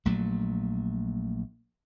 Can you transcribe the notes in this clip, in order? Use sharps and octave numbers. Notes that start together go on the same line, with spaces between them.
A#1 A#2 F#3 A3